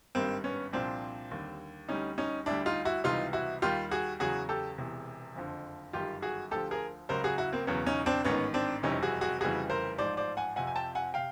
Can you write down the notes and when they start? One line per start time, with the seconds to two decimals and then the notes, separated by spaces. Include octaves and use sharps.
0.15 G#1 G2 D#3 G3 A#3 C4
0.44 B3 C#4
0.73 C2 A#2 F3 C4 D4
1.31 D#2 D3 G3
1.88 D2 D3 G3 C#4 D#4
2.18 C#4 D#4
2.46 D2 D3 G3 D4 E4
2.66 D#4 F4
2.85 E4 F#4
3.04 C#2 C3 E3 G3 D#4 F4
3.33 E4 F#4
3.62 D#2 D#3 G3 F4 G4
3.91 F#4 G#4
4.20 E2 C#3 F#3 F#4 G#4
4.49 G4 A4
4.78 E1 E2 C3
5.35 F#1 F2 D3 F3
5.93 G1 F#2 D#3 G3 F4 G4
6.22 F#4 G#4
6.51 D2 D3 F3 G4 A4
6.71 G#4 A#4
7.09 C#2 C#3 F#3 A#4 C5
7.24 F#4 G#4
7.38 E4 F#4
7.53 A#3 C4
7.67 E1 E2 C#3 F#3 B3 C#4
7.87 C#4 D#4
8.06 C4 D4
8.25 A1 G#2 D#3 B3 C#4
8.54 C4 D4
8.83 F#1 F2 C3 E3 G3 C#4 D#4
9.03 F#4 G#4
9.21 F#4 G#4
9.40 F1 F2 C#3 E3 G3 F#4 G#4
9.70 A#4 C5
9.98 A1 G#2 F3 C5 D5
10.17 C5 D5
10.37 F#5 G#5
10.56 F2 C3 F3 F#5 G#5
10.67 G#5
10.76 G5 A5
10.95 F#5 G#5
11.14 C3 F5 G5